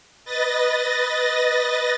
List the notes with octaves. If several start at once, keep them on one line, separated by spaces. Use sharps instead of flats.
B4 D#5 A6 A#6